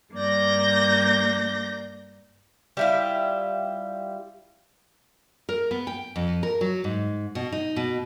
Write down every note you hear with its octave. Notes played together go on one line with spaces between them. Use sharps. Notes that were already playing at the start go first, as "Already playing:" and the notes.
G2 A#3 D5 G6 A#6
G3 E4 F4
A#4
B3
G5
F2
A#4
F#3
G#2
B2
D#4
B2